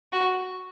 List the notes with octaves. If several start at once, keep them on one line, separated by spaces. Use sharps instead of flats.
F#4